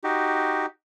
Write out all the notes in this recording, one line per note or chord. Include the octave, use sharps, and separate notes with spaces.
D#4 F#4 G4